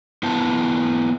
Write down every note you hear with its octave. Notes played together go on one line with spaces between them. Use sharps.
B3 E4 F4 A5